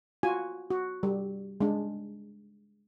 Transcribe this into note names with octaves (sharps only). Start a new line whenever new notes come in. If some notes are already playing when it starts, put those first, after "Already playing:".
F4 F#4 G#5
F#4
G3
G#3 D4